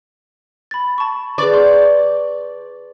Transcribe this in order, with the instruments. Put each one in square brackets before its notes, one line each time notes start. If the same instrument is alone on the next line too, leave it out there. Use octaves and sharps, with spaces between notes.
[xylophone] B5 A6
A5 C#6
[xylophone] G#4 B4 C#6 [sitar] D5
[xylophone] C6 G6